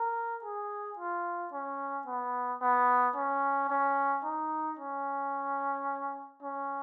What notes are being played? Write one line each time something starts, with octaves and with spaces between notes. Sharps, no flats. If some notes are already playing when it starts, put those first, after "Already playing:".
Already playing: A#4
G#4
F4
C#4
B3
B3
C#4
C#4
D#4
C#4
C#4